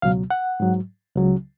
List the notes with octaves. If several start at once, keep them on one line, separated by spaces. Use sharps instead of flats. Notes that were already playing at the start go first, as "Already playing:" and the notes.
C#2 B2 F#3 F5
F#5
G#2 F#3
C#2 C#3 F#3